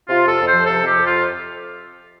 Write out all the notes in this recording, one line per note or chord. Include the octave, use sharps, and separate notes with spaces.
C3 F4
F2
A4
F2
F3 C5
C3 A4
F2
G4
F2
F4